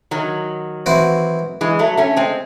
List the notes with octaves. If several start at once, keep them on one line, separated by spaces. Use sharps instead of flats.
D#3 F#3
E3 C4 F#4
E3 G#3
F#3 A3
A3 C#4
G#3 C4